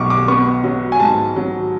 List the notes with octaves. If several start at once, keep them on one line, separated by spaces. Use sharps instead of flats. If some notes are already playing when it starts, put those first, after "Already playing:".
Already playing: B1 B2 C#6 D6
D6
B3 C#6
F#3
G#5
G#2 A5
F#3